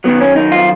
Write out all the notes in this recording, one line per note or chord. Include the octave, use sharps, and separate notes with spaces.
F#2 D#3 F#3 B3
C#4
D#4
F4